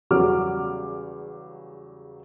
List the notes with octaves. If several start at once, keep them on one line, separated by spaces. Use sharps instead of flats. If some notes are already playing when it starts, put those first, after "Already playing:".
E2 C#3 F#3 G3 D6 F6